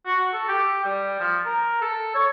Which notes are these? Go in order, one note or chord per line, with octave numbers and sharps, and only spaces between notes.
F#4
A4
G4
G3
F3
A#4
A4
C#5